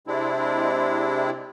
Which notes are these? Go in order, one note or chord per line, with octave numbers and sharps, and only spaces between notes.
C3 G#3 C4 D4 E4